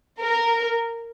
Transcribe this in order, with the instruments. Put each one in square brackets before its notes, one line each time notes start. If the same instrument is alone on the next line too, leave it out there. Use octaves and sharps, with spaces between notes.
[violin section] A#4